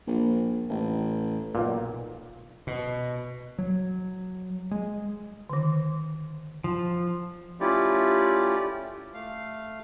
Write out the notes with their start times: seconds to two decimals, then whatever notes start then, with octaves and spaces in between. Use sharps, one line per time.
0.07 A#1
0.70 A1
1.55 B1 A#2
2.67 B2
3.58 F#3
4.71 G#3
5.50 D3 D#3
6.64 F3
7.60 A3 C#4 E4 F4 G4 D5
9.14 A3 F5